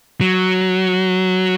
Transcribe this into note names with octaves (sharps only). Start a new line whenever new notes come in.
F#3